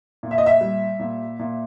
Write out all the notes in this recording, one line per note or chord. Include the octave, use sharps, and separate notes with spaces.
A#2
E5
D#5
E5
G3
A#2
A#2